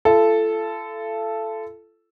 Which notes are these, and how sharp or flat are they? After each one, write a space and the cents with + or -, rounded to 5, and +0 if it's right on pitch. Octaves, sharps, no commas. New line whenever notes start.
F4 -45 A4 -5